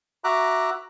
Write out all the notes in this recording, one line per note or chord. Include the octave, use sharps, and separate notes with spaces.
F#4 E5 A#5 D6 F#6